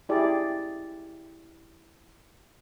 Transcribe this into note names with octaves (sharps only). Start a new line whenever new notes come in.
E4 G4 G#4 D5